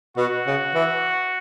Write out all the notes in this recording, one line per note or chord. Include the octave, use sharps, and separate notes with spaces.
B2 F#4
C#3
E3